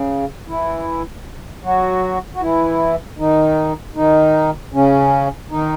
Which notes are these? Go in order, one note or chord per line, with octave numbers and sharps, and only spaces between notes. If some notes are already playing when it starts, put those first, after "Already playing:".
Already playing: C#3
E3 E4
F#3 F#4
F#4
E3 E4
D#3 D#4
D#3 D#4
C#3 C#4
D#3 D#4